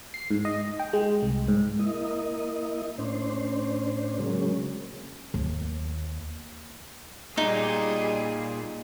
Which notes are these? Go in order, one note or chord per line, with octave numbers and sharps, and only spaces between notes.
C7
G#2
D#5
G5
G#3
C2
G#2
A#3 E4 D#5
A2 C#4 D4 C5
C#3 F#3 G#3 A#3 C#4
D#2
A#2 G3 D#4 G#4